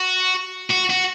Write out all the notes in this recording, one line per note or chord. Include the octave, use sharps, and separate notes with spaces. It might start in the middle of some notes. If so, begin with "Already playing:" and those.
Already playing: F#4
F#4
F#4